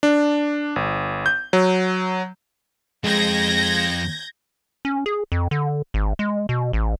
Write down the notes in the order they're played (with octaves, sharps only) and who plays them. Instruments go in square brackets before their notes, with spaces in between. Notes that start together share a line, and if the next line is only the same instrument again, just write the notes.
[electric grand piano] D4
G1
G6
F#3
[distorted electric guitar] F2 C4 [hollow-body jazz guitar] G#3 [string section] G6 G#6 A#6
[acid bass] C#4
G#4
F2
D3
G#1
G#3
B2
A1